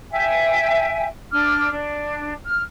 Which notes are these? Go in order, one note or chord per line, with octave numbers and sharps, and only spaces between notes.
E5 G5 G#5
D4 D6 F6
D4
F6